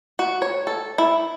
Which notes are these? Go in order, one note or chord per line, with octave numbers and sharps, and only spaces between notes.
F#4
C#5
A4
E4